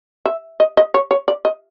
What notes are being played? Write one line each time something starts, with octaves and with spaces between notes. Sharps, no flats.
E5
D#5
D#5
C#5
C#5
D5
D#5